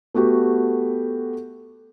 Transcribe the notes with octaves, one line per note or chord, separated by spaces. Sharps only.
A3 B3 F#4 G4